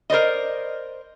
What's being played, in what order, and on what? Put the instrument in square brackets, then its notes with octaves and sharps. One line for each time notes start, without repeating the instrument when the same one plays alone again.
[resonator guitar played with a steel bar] A#4 C5 D5 D#5